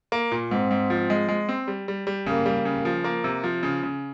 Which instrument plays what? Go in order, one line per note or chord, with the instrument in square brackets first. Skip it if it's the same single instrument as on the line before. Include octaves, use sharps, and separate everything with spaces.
[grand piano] A#3
A#2
[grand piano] G#2 [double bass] C4
[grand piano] G#2
F3
G#3
G#3
C4
G3
G3
G3
[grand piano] C#3 [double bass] A#3
[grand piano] G3
C#3
F3
A#3
C3
F3
C#3
C#3